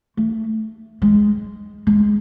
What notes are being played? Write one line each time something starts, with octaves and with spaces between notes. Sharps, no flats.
A3
G#3
G#3